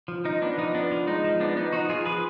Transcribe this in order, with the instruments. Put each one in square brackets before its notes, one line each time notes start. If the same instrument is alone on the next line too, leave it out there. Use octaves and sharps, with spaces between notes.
[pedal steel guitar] F3
F3 D#4
B3 D4
F3 D#4
B3 D4
F3
G#3 D#4
F3
B3 D4
B3 D#4
F3 D#4 F#4
F3 F4 G#4
F3 G#4 B4